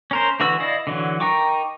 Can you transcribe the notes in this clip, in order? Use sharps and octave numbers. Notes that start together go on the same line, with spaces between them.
C#4 A#4 C5
D3 E3 F#4 B4 E6
E4 D5 D#5 F5
D3 E3 F#3
D#4 A#4 G5 C#6 D6